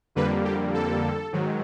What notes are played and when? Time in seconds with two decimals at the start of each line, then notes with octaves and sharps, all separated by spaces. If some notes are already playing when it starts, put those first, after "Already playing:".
0.15 F2 D3 G3 A#3 B4
0.45 G4
0.74 A4
1.32 G#2 D#3 F#3